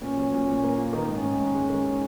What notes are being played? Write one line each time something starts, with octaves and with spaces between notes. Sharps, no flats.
A#2 C#4
F#3
A#2
A#2
A#3
F4
D#3 D#4
G#2
C#4
G#2
G#2
G#3
D#3